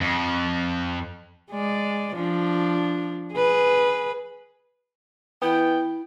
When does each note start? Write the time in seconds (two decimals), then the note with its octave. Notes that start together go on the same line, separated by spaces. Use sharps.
0.01 F2
1.51 G#3 D5
2.15 F3 D4
3.34 G#4 B4
5.42 E3 B3 E4 G5